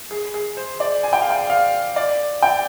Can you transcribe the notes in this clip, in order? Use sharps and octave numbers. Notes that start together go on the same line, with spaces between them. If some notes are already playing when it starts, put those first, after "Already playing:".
G#4
G#4
C5
D5
G#5
G5
F5
G5
F5
D5
G5